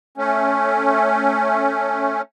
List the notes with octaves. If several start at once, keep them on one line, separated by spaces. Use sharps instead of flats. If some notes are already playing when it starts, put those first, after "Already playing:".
A3 C#4